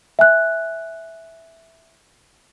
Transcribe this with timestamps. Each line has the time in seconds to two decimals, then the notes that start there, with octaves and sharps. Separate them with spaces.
0.19 E5 G#5 F#6